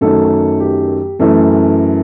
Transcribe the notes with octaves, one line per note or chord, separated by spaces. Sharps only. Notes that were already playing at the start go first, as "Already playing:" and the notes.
F#2 D#3 F#3 A3 A4
G4
F#2 E3 A3 A4